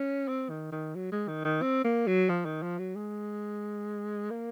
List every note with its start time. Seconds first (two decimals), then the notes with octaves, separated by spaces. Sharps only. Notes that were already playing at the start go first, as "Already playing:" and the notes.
Already playing: C#4
0.28 C4
0.50 D#3
0.72 D#3
0.95 F#3
1.12 G#3
1.28 D#3
1.44 D#3
1.62 C4
1.84 A#3
2.07 F#3
2.29 F3
2.45 D#3
2.62 F3
2.79 F#3
2.95 G#3
4.30 A#3